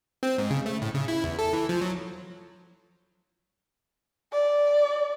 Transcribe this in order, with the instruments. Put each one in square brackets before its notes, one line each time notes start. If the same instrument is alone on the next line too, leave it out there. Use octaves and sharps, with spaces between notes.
[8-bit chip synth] C4
G#2
C#3
A3
A2
C#3
E4
E2
A4
E3
F3
F#3
[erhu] D5